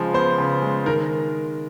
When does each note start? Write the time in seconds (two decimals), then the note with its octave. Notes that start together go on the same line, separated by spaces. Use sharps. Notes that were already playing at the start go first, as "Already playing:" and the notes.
Already playing: C#3 F3 G#3
0.13 B3 C5
0.38 C#3
0.62 G#3
0.86 D#3 A#4